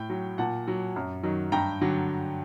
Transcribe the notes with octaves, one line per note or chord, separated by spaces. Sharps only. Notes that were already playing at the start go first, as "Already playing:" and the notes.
Already playing: A2 G5
F#3
A#2 F#5 A5
F#3
F#2
D#3 F#3
G2 G5 A#5
D3 F#3